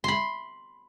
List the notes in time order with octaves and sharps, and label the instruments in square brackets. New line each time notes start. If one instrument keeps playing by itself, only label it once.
[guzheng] B5 C6